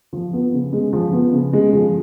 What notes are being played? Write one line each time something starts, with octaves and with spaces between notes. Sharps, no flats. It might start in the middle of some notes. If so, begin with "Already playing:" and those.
F3
B3
C#3
G#3
F3
B3
C#3
G#3
F3